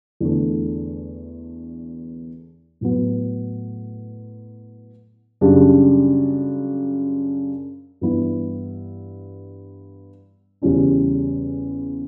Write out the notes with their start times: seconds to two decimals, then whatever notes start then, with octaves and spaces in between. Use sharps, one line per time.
0.20 E2 D3 A3
2.81 A2 F#3 B3
5.41 F#2 C#3 G3 D4
8.01 G2 E3 B3 E4
10.62 E2 C#3 G3 C#4 E4